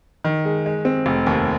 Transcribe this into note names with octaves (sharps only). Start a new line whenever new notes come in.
D#3
G#3
G#3
C4
F1
D#2